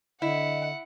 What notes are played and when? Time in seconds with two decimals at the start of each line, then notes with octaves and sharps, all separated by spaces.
0.22 D3 E4 D#5 F#5